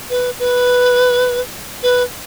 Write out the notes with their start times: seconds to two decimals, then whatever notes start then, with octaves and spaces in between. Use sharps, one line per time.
0.10 B4
0.40 B4
1.83 B4